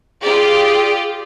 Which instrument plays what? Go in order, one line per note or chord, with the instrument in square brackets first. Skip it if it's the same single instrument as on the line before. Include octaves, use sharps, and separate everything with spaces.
[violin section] F4 G4 D5 [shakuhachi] G#4